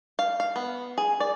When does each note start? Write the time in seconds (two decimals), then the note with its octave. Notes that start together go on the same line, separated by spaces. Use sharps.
0.19 F5
0.40 F5
0.56 B3
0.98 G#4
1.20 D5